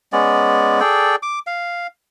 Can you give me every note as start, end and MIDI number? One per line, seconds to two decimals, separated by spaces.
0.13 0.80 56
0.13 0.80 59
0.13 0.80 61
0.13 0.80 74
0.80 1.16 68
0.80 1.16 69
0.80 1.16 74
0.80 1.16 79
1.23 1.39 86
1.47 1.87 77